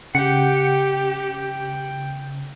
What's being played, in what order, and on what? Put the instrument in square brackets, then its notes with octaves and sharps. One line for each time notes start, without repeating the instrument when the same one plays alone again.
[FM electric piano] C#3 [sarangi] G4 [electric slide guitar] F#5 [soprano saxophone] G5